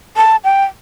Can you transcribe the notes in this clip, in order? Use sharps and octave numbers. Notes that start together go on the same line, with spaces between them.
A5
G5